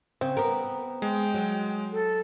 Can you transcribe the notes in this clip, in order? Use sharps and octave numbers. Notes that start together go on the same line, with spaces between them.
C#3 C4
B3 A#4
G#3 G5
F#3
A4